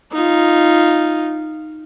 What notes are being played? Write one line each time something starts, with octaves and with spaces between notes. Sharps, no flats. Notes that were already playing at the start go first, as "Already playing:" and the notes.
D#4 F4